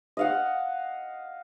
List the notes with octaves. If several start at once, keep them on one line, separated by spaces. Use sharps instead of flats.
D#5 F5 F#5